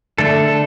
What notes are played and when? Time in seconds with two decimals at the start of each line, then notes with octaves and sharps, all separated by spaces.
0.18 D3 A3 D4 A4
0.48 A4